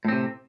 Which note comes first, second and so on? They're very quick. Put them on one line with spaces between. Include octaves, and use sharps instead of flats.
A2 C4 C3